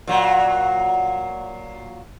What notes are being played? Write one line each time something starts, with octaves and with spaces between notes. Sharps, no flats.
A#2 F#3